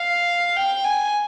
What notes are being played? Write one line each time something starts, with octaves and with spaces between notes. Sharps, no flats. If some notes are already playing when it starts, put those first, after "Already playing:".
Already playing: F5
G5
G#5